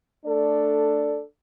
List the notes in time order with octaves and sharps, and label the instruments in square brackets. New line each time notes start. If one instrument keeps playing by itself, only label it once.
[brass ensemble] A3 D4 A4 D5